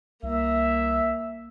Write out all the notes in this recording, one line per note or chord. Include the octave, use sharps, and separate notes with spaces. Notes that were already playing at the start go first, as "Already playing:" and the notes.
C2 A#3 E5